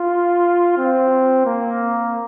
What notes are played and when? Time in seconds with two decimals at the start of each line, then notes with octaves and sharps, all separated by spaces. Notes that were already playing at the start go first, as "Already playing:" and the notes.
Already playing: F4
0.78 C4
1.46 A#3